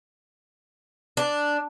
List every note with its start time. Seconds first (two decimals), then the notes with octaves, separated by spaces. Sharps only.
1.17 D4